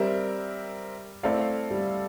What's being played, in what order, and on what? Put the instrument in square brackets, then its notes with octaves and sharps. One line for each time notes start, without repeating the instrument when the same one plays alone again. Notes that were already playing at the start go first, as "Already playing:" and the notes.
Already playing: [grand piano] G3 [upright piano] C4 G4 A#4 E5
[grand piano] A3 [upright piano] C4 E4 A4 D5 F5
[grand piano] G3